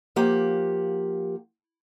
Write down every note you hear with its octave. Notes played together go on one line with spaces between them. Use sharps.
F3 A#3 G4 F#5